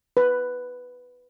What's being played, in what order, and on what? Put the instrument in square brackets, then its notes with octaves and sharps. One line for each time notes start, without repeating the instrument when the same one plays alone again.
[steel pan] B4